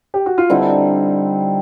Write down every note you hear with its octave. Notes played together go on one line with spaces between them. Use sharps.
G4
F#4
F4
D3 G3 C4 D#4 E4